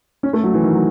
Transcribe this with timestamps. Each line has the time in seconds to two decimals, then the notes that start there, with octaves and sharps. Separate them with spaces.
0.23 C#4
0.33 A3
0.43 F#3
0.54 E3
0.64 D#3
0.74 F#3